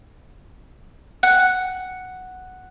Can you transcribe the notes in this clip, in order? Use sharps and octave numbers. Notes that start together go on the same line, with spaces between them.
F#5